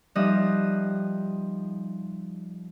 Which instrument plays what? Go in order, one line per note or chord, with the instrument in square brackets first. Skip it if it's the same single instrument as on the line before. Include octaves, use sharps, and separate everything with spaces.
[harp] F3 G3 D#4 E5 D#6 F#6